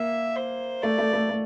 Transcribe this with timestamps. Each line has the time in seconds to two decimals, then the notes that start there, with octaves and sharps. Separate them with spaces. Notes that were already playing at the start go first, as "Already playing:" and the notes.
Already playing: A#3 E5
0.36 C5
0.82 A3 D5
0.98 A3
1.13 A3
1.29 A3